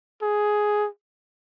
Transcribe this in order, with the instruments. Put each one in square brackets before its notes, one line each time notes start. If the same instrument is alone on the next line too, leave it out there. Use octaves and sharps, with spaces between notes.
[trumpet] G#4